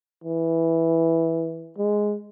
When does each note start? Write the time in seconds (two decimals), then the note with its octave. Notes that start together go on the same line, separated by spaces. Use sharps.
0.24 E3
1.78 G#3